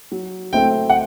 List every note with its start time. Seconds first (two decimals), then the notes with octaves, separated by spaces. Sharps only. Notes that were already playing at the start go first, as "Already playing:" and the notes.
0.12 F#3
0.53 A3 C4 E4 A4 G5
0.89 F#5